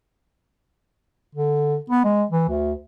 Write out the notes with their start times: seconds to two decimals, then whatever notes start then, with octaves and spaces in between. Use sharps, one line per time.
1.35 D3
1.90 B3
2.04 G#3
2.31 E3
2.49 D2